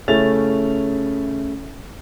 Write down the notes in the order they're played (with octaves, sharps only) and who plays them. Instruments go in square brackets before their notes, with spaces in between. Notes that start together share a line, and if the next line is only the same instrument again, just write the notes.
[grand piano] C#3 A3 C#4 E4 A6 F7